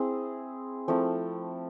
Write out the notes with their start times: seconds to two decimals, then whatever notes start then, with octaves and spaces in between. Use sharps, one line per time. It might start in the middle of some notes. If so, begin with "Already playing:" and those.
Already playing: C4 E4 G#4
0.88 F3 A3 C4 E4